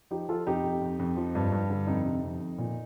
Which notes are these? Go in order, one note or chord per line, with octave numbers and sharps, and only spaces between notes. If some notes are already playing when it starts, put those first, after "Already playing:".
F3 D#4 G4
F3 F4 A4
F2 D#4 G4
F2
F2
F2
F3
G2
G2
D3
F2 D#4
C3
F2
F2
A#2